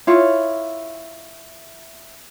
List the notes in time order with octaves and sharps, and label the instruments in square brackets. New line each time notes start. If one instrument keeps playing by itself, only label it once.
[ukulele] E4 F4 C#5